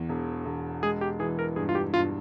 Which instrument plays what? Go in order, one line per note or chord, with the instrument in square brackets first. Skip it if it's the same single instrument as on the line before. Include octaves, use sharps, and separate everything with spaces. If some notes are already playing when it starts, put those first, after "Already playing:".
Already playing: [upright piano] E2 E3
E1
E1
[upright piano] G#3 [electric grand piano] G#4
[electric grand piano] G4
[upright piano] E3 [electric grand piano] G#4
[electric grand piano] A#4
[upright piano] G2 [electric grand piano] G#4
[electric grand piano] F4
G4
[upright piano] G2 [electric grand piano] F4